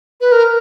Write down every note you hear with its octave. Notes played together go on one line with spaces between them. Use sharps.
B4
A#4